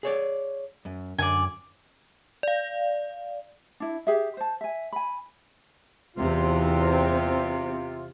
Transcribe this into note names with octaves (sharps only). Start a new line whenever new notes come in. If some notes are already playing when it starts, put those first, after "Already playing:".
G#4 C#5 D5
F#2
F#2 D3 D5 G#5
D5 F5
D4 E4
G4 G#4 E5
C5 A5
E5 G#5
G#5 B5
E2 C3 C4 F4